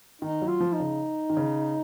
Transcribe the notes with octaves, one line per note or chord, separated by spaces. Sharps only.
D#3 D#4
F#3
F4
F3
D#4
C#3
D#3
C#3